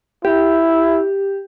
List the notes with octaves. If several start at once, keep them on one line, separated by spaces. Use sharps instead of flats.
E4 G4